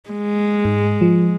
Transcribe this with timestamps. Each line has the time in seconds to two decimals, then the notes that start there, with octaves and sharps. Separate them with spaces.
0.10 G#3
0.65 G#2
1.01 F3